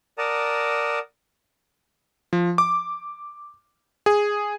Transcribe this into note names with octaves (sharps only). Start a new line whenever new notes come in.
A#4 D5 F#5 A5 A#5 D#6
F3
D6
G#4